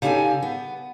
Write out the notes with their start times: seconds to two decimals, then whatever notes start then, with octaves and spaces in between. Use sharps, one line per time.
0.02 C#3 D#4 G4 A4 G#5
0.43 B3